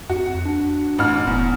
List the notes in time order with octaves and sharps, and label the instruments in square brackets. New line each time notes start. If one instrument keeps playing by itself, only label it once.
[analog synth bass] F2 [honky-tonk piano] F#4
[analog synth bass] D4
[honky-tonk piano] A1 F6
[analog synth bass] F1 [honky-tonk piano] E2